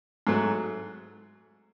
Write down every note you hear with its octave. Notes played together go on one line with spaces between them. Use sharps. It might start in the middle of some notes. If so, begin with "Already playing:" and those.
G#2 F#3 A3